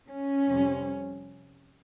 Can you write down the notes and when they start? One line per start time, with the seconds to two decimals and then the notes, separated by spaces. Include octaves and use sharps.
0.09 C#4
0.48 F2 C3 G3